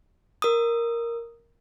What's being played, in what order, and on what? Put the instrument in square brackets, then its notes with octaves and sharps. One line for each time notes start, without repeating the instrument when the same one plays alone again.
[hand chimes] A#4 D#6